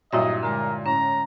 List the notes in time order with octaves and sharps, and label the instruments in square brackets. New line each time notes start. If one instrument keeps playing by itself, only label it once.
[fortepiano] G2 A#2 F#3 [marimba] E4 E5 [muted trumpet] D#5
[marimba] D3 G#3 D6 [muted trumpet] A#4
[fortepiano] A2 [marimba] C#4 [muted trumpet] A#5